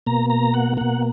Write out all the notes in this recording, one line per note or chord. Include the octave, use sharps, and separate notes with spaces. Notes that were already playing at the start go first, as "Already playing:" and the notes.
B2 A#3 A#5
A#5
F#5
B2 A#3 F#5